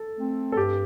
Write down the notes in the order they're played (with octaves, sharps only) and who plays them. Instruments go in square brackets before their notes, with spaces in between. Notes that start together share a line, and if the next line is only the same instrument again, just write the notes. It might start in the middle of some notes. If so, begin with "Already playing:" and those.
Already playing: [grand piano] A4
[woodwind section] A3 C4
[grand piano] A4
[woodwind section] G2 [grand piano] G4